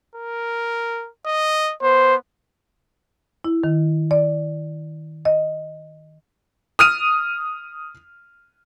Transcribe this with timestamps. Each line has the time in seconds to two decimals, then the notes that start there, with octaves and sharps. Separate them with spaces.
0.15 A#4
1.26 D#5
1.83 B3 C5
3.45 E4
3.64 D#3
4.11 D5
5.25 D#5
6.79 D#6 F6 D#7